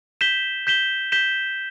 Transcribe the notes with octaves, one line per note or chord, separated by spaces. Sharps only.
G6 B6 E7 G7
G6 B6 E7 G7
G6 B6 E7 G7